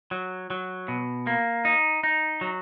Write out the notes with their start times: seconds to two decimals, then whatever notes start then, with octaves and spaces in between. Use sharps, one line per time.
0.11 F#3
0.50 F#3
0.88 B2
1.27 A#3
1.65 D#4
2.03 D#4
2.41 F#3